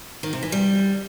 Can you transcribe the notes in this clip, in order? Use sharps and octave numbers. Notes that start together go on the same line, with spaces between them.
D#3
C3
E3
G3